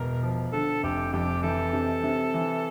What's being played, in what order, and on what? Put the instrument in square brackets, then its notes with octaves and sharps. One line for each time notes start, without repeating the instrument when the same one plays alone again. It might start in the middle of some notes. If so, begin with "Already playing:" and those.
Already playing: [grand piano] E1 [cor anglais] A#4
[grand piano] F3
[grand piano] D3 [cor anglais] A4
[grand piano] F1 [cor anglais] G4
[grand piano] F2 [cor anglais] G4
[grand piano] E3 [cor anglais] A4
[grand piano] C3
C3
E3